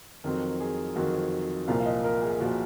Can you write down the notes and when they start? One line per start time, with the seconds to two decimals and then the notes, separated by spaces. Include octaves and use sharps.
0.24 F2 D#3 F#3 C4 A#4
0.60 G#4
0.96 F2 D#3 F#3 C4 F#4
1.68 C2 A#2 F3 A#3 F5
1.80 F5
1.86 D#5
2.04 A#4
2.22 G#4
2.40 A#2 F3 A#3 F#4